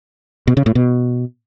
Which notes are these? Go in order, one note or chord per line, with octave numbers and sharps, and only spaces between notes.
B2
C#3
A2
B2